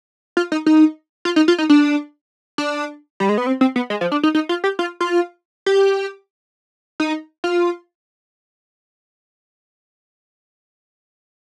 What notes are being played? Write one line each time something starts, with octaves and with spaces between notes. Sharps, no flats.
F4
D#4
D#4
F4
D#4
F4
D#4
D4
D4
G3
G#3
B3
C4
C4
B3
G#3
F3
D4
D#4
D#4
F4
G4
F4
F4
G4
D#4
F4